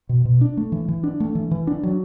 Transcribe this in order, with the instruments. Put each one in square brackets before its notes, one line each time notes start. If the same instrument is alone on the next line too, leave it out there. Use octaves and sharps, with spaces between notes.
[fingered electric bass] B2
B2
D4
A3
E3
E3
D4
A3
E3
E3
D4
F#3